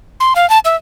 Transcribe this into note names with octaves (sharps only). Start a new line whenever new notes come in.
C6
F5
A5
E5